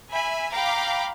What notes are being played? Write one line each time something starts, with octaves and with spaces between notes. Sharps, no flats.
E5 G#5 B5
F5 G5 A#5 B5 D6